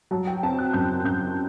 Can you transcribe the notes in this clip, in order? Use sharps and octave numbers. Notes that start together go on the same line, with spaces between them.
F#3 A5
G5
C4 A5
F#6
F#2 G6
F#2 G6